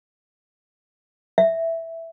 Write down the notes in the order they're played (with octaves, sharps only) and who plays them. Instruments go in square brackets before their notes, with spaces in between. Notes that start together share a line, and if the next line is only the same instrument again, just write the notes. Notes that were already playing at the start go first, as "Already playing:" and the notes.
[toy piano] E5